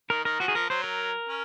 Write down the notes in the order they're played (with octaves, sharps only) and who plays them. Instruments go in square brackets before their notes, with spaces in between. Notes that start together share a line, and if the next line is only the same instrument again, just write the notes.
[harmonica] D#3 [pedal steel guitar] A#4
[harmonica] D#3 [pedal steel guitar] A#4
[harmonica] F3 [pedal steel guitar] F#4
[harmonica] D#3 [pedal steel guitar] G#4
[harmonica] F3 [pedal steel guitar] A#4
[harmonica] F#3 [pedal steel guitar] C5
[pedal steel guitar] A#4
[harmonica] C#4